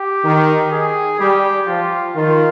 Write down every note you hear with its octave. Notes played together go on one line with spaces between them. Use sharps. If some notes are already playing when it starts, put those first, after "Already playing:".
Already playing: G4
D#3
G#4
G3 G4
F3 F4
D#3 F4